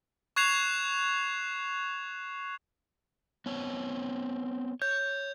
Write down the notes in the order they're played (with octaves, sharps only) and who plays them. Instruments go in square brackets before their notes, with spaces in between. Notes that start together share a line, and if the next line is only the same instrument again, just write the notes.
[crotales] C#6 F#6 G#6 C7 E7 F7
[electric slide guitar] B3 C4 C#5
[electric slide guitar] C#5 [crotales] G6